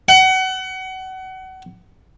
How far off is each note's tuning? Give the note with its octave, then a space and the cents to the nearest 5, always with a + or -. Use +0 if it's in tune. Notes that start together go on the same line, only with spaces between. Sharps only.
F#5 +30